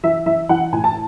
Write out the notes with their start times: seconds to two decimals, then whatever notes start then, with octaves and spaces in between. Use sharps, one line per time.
0.03 E3 E5
0.26 E3 E5
0.49 E3 F#5
0.72 A2 G#5
0.84 A5